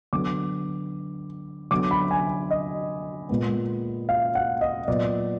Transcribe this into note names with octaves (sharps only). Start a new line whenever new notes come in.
D3 F#3 B3 D6
D3 F#3 B3 D6
B5
G#5
D#5
A#2 G#3 B3
F5
F#5
D#5
A#2 F#3 B3 D5